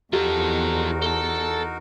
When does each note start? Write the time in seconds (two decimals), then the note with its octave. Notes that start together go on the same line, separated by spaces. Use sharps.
0.13 E2 F3 D#4 F#4 G4 A4 A#4
1.02 A4 A5